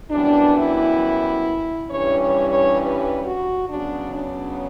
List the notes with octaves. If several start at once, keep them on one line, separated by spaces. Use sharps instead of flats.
F#2 E3 G3 B3 D4
E4
G2 E3 G3 C#4 C#5
C#5
C#5
B4
F#4
C#3 F#3 B3 D4
D4